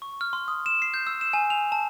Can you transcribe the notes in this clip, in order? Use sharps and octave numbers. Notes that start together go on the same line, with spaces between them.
C#6
F6
C6
D#6
E7
C7
G6
E6
E7
G#5
F7
A5